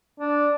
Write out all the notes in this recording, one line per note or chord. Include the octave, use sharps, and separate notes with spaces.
D4